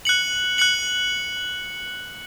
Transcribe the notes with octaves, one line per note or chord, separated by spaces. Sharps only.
F#6 C#7 F#7
F#6 C#7 F#7